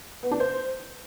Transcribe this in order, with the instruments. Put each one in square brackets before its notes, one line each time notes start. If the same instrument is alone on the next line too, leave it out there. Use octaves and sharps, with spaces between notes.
[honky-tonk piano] B3
D4
C5